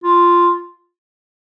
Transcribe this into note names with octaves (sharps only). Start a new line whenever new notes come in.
F4